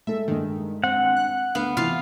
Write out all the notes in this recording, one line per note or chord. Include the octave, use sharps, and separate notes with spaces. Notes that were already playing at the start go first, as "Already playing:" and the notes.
G#3 A4 E5
G2 D#3 G#3
C4 F#5
F#6
D2 B3 F5
C3 E3 F4 F5